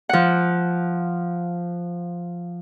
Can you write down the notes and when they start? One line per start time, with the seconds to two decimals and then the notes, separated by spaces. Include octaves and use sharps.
0.09 F3 F#5